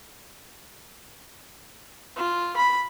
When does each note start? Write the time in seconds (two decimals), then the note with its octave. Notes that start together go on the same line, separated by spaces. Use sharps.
2.17 F4
2.57 B5